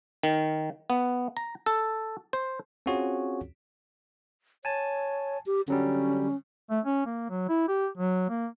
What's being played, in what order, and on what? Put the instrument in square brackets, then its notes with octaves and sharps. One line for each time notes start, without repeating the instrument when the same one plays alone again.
[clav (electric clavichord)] D#3
B3
A#5
A4
C5
[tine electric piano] C4 C#4 F4 F#4 G#4 C#5
[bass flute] C#5 [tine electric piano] G#5 A5
[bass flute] G4
[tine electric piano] D3 F#3 G3 [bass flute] C#4
[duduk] A3
C#4
A#3
F#3
E4
G4
F#3
A#3